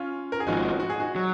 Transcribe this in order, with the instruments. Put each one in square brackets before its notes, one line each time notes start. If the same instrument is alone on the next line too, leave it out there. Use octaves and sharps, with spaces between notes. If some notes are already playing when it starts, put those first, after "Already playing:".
Already playing: [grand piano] C#4 F4
A#4
G#4
[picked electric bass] G#1 G#2 F3 [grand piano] D#4 F#4
[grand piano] F#4
G#4
D#4 F#4
[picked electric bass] F#3